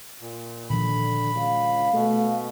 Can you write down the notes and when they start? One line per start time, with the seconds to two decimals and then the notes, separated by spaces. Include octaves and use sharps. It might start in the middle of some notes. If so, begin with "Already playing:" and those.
0.21 A#2
0.70 A#2 D3 D#3 F3 B5
1.35 C#2 F5
1.93 B2 A3